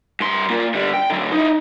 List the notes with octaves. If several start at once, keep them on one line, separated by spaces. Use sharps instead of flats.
G2 C6
A#3 F4
D3 G3
G5
D3 F#3
D#4 E4